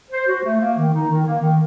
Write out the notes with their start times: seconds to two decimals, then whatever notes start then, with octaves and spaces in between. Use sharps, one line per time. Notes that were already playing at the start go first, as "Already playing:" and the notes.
0.11 C5
0.28 F#4
0.44 A3
0.60 A#3
0.77 D#3
0.93 D#4
1.10 D#3
1.26 A#3
1.42 D#3